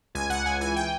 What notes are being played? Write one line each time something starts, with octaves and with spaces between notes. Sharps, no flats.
C#2 G#5
C#2 F#5
C#2 G#5
E3 G#5
G5